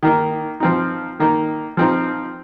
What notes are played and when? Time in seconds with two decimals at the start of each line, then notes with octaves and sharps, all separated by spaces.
0.03 D#3 A#3 D#4
0.60 F3 C4 D#4
1.20 D#3 A#3 D#4
1.77 F3 C4 D#4